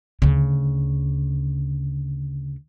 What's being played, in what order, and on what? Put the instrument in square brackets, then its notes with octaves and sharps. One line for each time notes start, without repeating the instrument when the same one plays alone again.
[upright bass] D2 C#3